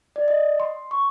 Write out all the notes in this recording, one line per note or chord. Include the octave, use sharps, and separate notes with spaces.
D5
D#5
C6
C#6